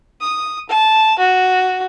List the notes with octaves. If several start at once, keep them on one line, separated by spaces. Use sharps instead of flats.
D#6
A5
F#4